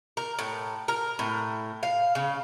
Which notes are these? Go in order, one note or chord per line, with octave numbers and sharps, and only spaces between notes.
A#4
A2
A#4
A2
F5
C#3